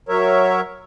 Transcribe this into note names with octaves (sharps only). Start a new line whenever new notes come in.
F#3 A#4 C#5 E5